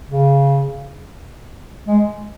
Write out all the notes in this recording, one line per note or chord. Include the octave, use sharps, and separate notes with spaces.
C#3
G#3